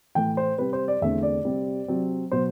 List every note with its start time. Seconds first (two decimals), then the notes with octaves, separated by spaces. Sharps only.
0.15 A2 E3 A3 G5
0.37 C5
0.58 C3 G3 C4 B4
0.73 C5
0.88 D5
1.02 E2 D3 A3 C4 E5
1.23 D5
1.45 C3 G3 C4
1.88 C3 F#3 C4
2.31 B2 F#3 B3 C5